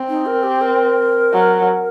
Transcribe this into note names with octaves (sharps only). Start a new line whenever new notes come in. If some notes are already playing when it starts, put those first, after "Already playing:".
Already playing: C4
D#4
A#4
G4
A#4
F#3